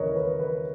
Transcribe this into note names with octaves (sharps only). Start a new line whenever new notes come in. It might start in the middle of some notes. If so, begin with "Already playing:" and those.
Already playing: D#2 C#3 E3 A#4 B4 C#5 D#5
B4
B4